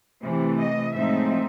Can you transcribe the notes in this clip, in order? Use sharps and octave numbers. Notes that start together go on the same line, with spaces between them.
C3 E3 A3
D#5
A2 F3 G#3 C4 D#4 E5